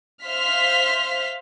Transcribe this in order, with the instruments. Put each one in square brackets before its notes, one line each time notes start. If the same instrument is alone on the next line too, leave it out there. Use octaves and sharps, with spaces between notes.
[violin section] C5 E5 F5 C6 F6 B6